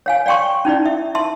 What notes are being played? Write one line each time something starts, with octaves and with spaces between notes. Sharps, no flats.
C#5 F5 G#5
D5 F5 G5 C6 C#6
C#4 D#4 E4 D5
E5
E5 A5 C6